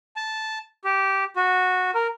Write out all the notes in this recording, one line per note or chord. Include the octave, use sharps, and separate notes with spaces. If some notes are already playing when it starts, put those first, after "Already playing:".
A5
G4
F#4
A#4